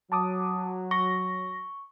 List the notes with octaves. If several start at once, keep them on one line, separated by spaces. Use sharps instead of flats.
F#3 A5 D6 D#6
C#6 A#6